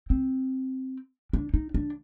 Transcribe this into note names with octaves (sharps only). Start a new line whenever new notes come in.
C4
D4
D#4
D4